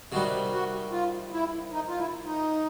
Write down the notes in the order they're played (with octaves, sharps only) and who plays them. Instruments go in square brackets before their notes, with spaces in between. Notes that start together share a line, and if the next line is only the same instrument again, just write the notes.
[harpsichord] C3 D#3 G3 [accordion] F#4
[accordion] F#4
F4
E4
D#4
F4
E4
D#4